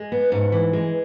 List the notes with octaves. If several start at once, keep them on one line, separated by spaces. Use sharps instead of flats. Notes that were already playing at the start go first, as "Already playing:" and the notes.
Already playing: G#3
B3
G#2
E3
G#3